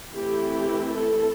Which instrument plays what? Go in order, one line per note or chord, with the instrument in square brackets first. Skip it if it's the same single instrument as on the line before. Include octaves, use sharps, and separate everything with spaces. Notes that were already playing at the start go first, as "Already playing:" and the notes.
[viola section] E3 A3 C4 E4 G4
G4
A4